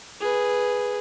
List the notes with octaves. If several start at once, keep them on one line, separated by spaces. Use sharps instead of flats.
G#4 B4